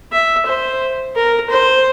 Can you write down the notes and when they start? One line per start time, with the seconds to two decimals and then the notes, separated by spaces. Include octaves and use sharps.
0.13 E5
0.46 C5
1.15 A#4
1.50 C5